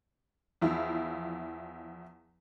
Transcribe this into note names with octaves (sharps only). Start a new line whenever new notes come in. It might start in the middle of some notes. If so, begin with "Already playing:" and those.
E2 F3 E4 F4